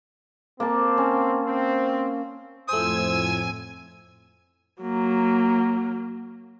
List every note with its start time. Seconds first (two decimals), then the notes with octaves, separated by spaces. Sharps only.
0.60 A#3 C4 A5
0.98 C#4
1.44 C4
2.69 F2 A2 A3 C5 G#5 E6 G#6
4.81 F#3 A#3